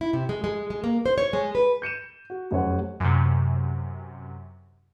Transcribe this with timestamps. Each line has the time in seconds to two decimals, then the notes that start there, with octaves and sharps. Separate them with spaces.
0.01 E4
0.13 C3
0.29 G#3
0.44 G#3
0.70 G#3
0.84 A#3
1.06 C5
1.18 C#5
1.33 G#3
1.55 B4
1.82 G6 C#7 D#7 E7
2.30 F#4
2.51 F1 F#2 C5 C#5 F#5
3.00 F#2 C3